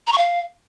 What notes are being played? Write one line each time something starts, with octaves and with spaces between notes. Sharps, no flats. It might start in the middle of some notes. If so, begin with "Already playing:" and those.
A#5
C#6
F5